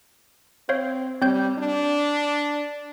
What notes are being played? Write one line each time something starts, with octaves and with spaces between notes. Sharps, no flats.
C4 C5 C#5 F5
G3 C4 C#5 G6
D4